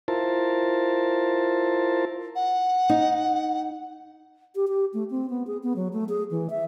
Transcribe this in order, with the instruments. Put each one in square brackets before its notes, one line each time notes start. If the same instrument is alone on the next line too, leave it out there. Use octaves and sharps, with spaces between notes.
[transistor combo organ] E4 F4 A#4 C5 A5
[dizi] F#5
[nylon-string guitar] D#4
[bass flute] G4
G4
A3
C4
B3
G#4
B3
F#3
A3
G#4
E3
E5